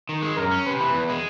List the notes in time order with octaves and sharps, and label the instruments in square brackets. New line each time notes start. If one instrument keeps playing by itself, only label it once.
[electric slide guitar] D#3
G#3
[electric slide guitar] F#2 [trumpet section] A#4
[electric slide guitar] C#4
[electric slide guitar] C3 [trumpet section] B4
[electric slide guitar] E3
E2
G#3